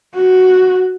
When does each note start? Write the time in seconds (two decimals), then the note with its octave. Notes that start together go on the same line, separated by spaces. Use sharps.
0.15 F#4